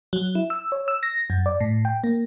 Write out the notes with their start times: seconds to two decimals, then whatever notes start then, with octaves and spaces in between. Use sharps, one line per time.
0.13 F#3
0.35 E4
0.50 E6
0.72 C#5
0.88 E6
1.03 A#6
1.30 F#2
1.46 D5
1.61 A2
1.85 G5
2.04 A#3